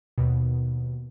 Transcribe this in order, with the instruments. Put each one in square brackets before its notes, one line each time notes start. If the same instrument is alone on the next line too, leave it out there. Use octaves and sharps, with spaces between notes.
[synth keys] D#2 B2